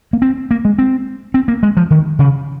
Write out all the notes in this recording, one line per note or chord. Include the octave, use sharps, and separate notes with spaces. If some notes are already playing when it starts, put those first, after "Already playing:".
A#3
C4
A#3
G#3
C4
C4
A#3
G#3
F3
D#3
C#3